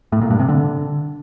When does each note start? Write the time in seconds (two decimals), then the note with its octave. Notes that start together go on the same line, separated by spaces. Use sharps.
0.12 A2
0.21 A#2
0.30 G2
0.40 C3
0.49 D3